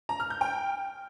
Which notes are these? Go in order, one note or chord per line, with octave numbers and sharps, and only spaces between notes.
A#5
F6
G6
G5